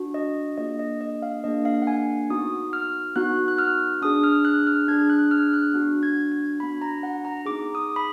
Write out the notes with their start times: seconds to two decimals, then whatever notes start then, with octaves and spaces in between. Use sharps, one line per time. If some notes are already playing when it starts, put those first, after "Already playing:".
Already playing: D4 F#4
0.14 D#5
0.58 A#3 D4 F4 G#4 D#5
0.79 D#5
1.01 D#5
1.22 F5
1.44 A#3 D4 F4 G#4 D#5
1.65 F5
1.82 F#5
1.87 G#5
2.30 B3 D#4 F#4 D#6
2.73 F6
3.16 B3 D#4 F#4 F#6
3.48 F#6
3.58 F6
4.02 D4 G#4 D#6
4.23 F6
4.45 F#6
4.67 F6
4.88 D4 G#4 G#6
5.10 F#6
5.31 F6
5.43 F6
5.53 F#6
5.73 B3 D4 F#4
6.03 G#6
6.32 G#6
6.60 B3 D4 F#4 B5
6.82 A#5
7.03 F#5
7.25 A#5
7.46 B3 D#4 G#4 D6
7.75 D#6
7.96 B5